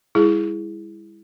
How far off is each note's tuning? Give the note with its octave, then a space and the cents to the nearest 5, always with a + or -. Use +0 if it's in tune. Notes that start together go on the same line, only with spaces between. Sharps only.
G3 +45 E4 +0 G#4 +0